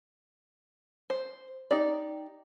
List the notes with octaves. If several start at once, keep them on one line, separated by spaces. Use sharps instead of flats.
C5
D#4 G4 D5